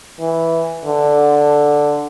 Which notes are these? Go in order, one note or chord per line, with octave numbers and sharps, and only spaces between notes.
E3
D3